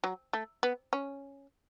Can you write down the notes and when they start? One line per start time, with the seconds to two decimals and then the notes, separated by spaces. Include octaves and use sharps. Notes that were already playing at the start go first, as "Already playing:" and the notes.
0.04 F#3
0.33 A3
0.63 B3
0.93 C#4